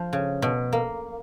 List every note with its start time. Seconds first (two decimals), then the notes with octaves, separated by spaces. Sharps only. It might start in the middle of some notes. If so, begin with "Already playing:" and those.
Already playing: F3
0.13 C#3
0.42 B2
0.73 A#3